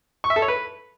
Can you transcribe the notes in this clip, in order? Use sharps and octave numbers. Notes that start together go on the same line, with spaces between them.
C#6
E5
A4
C#5
B4